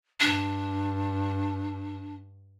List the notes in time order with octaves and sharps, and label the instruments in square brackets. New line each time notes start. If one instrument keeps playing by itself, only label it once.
[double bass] G2 [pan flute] D4